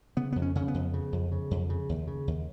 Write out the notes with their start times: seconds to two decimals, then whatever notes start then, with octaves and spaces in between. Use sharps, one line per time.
0.17 C#3 B3
0.32 F2 B3
0.42 C#4
0.55 C#3 C#4
0.68 B3
0.74 F2
0.94 C#3
1.12 F2
1.32 C#3
1.51 F2
1.70 C#3
1.89 D#2
2.07 C#3
2.28 D#2